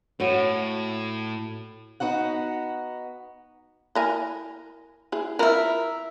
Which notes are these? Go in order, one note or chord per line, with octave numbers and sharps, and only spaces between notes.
A2 F#4 C#5
B3 D#4 F#4 F#5
E4 A#4 G#5
E4 G#4
E4 F4 A#4 E5